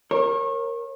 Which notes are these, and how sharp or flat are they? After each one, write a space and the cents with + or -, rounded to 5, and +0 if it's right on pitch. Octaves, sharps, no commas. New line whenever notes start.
A#4 +0 C#5 -35